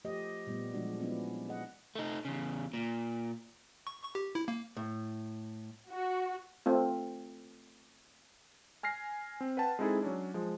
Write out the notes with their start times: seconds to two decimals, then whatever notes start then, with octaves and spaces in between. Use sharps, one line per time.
0.04 F3 A3 G4 C5 D#5
0.47 A#2 G3 B3
0.74 F3 F#3 G#3 D4 F#4
1.00 F3 B3 C#4 D4 E4
1.49 G#4 D#5 F#5
1.95 A3 D#4
2.25 E2 C#3
2.74 A#2
3.87 C#6
4.03 C#6
4.15 G4
4.35 E4
4.48 A#3
4.77 A2
5.90 F#4
6.66 A3 C4 F4
8.83 G#5 F6 A#6 C7
9.41 C4
9.57 B4 F#5 G5 A5
9.79 G#3 C4 D#4 E4 G#4 A4
10.02 F#3 C#4 D4
10.34 F3 G#3